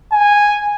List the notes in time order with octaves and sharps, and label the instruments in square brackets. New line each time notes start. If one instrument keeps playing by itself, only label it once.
[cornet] G#5